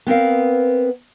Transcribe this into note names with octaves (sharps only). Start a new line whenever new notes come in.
B3 C4 A#4 F5